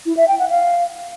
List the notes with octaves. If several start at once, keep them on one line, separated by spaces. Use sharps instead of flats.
E4
E5
G5
F#5
F5